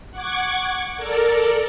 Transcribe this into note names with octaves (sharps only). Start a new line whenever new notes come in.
F#5 C#6 D6 G#6
A4 A#4 D5